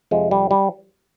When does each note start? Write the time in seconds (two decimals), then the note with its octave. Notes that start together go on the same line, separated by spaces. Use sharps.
0.11 F2 C3 F3 G#3
0.31 G3
0.51 G3